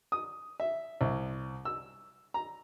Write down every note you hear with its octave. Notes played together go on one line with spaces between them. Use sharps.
D#6
E5
C2
E6
A#5